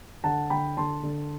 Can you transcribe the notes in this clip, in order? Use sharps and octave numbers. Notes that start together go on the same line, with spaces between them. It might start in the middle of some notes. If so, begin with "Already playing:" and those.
D3 F#5 A5
D3 G5 B5
D3 A5 C6
D3